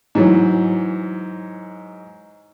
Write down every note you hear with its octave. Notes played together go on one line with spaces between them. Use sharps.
G#2 E3 F#3